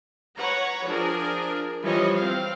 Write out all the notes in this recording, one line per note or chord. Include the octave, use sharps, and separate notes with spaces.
B4 C#5 F#5 A#5
F3 D4 G#4 A#4
E3 F3 G3 C#5 D#5
C4 F5